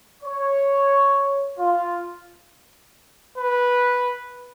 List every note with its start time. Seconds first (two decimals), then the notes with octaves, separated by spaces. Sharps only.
0.23 C#5
1.58 F4
3.38 B4